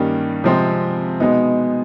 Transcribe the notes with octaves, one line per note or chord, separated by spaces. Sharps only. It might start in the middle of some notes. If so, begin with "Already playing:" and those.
Already playing: G2 D#3 G3 A#3 C#4
C3 F3 G#3 C4
B2 G#3 B3 D#4